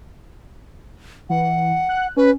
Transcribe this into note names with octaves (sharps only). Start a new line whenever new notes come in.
E3 F#5
F#6
C#4 B4